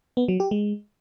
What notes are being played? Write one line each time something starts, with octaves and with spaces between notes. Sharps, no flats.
B3
F#3
G4
G#3